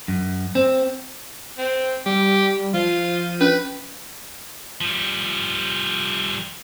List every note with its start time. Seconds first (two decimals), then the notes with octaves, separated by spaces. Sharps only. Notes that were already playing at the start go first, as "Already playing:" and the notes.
0.08 F#2
0.55 C4
1.58 C4
2.06 G3 G4
2.74 F3 F4 D#7
3.41 C#4 B4
4.81 F3 G3